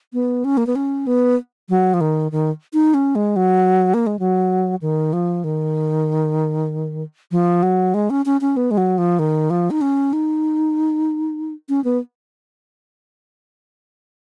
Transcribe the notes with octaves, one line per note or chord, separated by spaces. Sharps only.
B3
C#4
A#3
B3
C#4
B3
F#3
F3
D#3
D#3
D#4
C#4
G#3
F#3
A#3
G#3
F#3
D#3
F3
D#3
F3
F#3
G#3
C#4
C#4
C#4
B3
G#3
F#3
F3
D#3
F3
D#4
C#4
D#4
C#4
B3